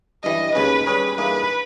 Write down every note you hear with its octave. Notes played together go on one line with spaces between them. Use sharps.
G2 E3 G3 D#5
D#2 C#3 G#3 C#4 B4
G3 C#4 G#4 B4 C#5
G2 E3 A#3 D#4 G#4 B4